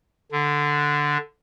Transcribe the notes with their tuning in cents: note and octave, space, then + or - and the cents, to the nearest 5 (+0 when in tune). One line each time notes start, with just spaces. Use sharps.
D3 +0 D4 +0